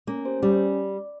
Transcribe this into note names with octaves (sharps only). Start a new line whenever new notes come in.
A#3 C#4
G4 C5
G3 C#4